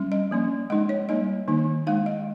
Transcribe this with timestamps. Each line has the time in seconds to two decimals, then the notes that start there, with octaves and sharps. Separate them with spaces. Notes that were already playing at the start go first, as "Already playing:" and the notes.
Already playing: G3 C#4
0.12 D#5
0.31 F3 A#3 C#4
0.70 G#3 D#4 D#5
0.89 C#5
1.09 G3 A#3 D#4 D#5
1.48 D#3 A#3 D#4
1.87 G#3 D#4 F5
2.06 D#5